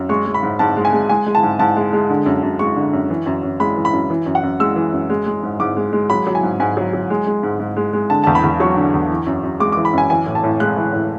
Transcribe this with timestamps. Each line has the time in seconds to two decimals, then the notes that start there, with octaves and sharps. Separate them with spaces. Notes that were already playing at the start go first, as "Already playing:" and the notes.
Already playing: F#2
0.09 G#3 C#6
0.26 G#3
0.34 B5
0.43 G#2
0.59 G#2 A5
0.77 G#3
0.85 G#5
0.93 G#3
1.09 G#3 G#5
1.26 G#3
1.35 A5
1.43 G#2
1.59 G#2 A5
1.77 G#3
1.93 G#3
2.10 D3
2.26 F#2
2.43 F#2
2.59 G#3 C#6
2.76 D3
2.93 F#2
3.10 E3
3.26 F#2
3.43 F#2
3.60 G#3 B5
3.76 E3
3.85 B5
3.93 F#2
4.10 E3
4.26 F#2
4.35 F#5
4.43 F#2
4.60 G#3 E6
4.76 E3
4.93 F#2
5.10 G#3
5.26 G#3
5.43 G#2
5.60 G#2 D6
5.77 G#3
5.93 G#3
6.10 F#3 B5
6.27 F#3
6.35 G#5
6.43 G#2
6.60 G#2 G#5
6.77 F#3
6.93 F#3
7.10 G#3
7.27 G#3
7.43 G#2
7.60 G#2
7.77 G#3
7.93 G#3
8.10 D3 A5
8.24 E2 A5
8.35 B5
8.44 E2
8.60 F#3 C#6
8.77 D3
8.94 E2
9.10 E3
9.27 F#2
9.43 F#2
9.60 G#3 D6
9.72 D6
9.77 E3
9.85 B5
9.93 F#2 G#5
10.10 E3 G#5
10.26 A2
10.35 A5
10.44 A2
10.60 G#3 F#6
10.77 E3
10.93 A2